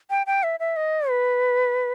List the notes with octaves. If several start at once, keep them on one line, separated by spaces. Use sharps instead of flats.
G5
G5
E5
E5
D#5
B4